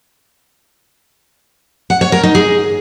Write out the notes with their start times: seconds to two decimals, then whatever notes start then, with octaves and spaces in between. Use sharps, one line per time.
1.90 F#5
2.01 C#5
2.12 A#4
2.23 D#4
2.35 G#4